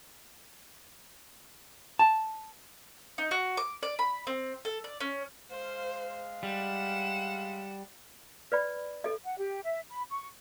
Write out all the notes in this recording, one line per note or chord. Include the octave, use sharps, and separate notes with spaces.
A5
D#4
F#4
D6
D5
B5
C4
A4
D5
C#4
G#3 C5 F5
G3 F#5 E7
B4 D5 B5
A4 D#5
F#5
G4
E5
B5
C#6